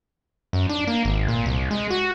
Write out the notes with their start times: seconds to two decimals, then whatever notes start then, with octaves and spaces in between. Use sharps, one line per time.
0.53 F#2
0.69 D4
0.87 A#3
1.05 G#1
1.28 A#2
1.46 C2
1.71 G#3
1.90 F#4